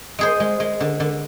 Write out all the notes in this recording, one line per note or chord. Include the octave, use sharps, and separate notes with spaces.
G#3 G#4 C5
G#3
G#3
D3
D3